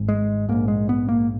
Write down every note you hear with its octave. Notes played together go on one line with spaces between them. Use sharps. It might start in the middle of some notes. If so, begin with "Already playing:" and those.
Already playing: G#1 G#2
G#3
A#1 G#2 A#3
G#3
B3
A#3